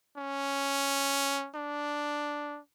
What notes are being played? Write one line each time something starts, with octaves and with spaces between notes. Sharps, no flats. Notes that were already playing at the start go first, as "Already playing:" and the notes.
C#4
D4